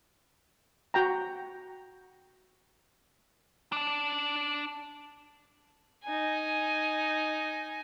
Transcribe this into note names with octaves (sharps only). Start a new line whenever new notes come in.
F#4 G5 A#5
D4 A5
D#4 G#5